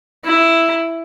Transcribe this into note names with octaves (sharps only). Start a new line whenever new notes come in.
E4